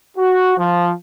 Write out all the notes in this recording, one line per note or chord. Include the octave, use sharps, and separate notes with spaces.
F#4
F3